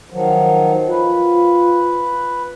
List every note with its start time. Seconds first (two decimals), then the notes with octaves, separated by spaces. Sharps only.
0.10 D#3 F3 F#3
0.89 F4 B4